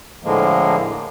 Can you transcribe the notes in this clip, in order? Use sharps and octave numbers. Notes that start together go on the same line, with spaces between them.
A2 D3 F3 G#3 A#3